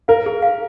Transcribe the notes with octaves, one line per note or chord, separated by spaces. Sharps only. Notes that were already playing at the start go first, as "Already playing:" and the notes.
A#4 F5
G#4
F5